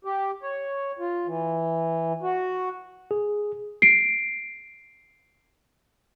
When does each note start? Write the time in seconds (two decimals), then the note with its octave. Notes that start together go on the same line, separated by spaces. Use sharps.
0.05 G4
0.43 C#5
0.99 F4
1.27 E3
2.22 F#4
3.11 G#4
3.82 C7 D7